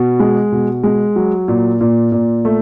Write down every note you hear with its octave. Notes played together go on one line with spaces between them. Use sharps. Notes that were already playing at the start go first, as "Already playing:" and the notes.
Already playing: B2
G#3
B2
G#3
F#3
A#2
A#2
A#2
A3